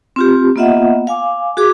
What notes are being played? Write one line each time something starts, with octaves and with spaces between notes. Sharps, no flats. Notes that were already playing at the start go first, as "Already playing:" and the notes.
C4 F4 G4
A#3 B3 F4 D#5 E5 F#5
F5 G#5 D6
F#4 G#4 D6